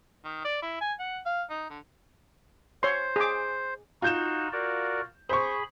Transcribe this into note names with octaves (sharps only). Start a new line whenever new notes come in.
D#3
D5
E4
G#5
F#5
F5
D#4
D3
C5 C#5 C6
G#4 D6
D#4 F4 F#4 G6 E7
F#4 A#4 D5
G#4 C5 B5 C#6